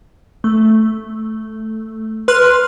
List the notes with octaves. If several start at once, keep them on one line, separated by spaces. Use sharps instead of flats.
A3
B4 C6 F6 F#6